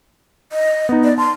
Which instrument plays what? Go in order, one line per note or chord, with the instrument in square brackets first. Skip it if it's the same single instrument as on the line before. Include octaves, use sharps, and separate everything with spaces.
[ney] D#5
[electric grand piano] B3 D#4
[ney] D5
[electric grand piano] A5 [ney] C6